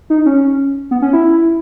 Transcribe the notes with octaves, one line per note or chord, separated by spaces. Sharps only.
D#4
C#4
B3
C#4
E4